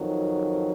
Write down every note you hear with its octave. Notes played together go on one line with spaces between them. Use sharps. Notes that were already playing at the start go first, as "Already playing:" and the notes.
Already playing: F2 D#3 F#3